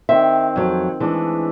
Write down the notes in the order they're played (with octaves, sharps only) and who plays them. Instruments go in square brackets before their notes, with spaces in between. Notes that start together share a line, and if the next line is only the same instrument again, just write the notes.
[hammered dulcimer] D#3 C4 [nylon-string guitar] E5
[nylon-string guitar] F2 F#3
[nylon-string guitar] E3 [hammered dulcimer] G#3 A3 D4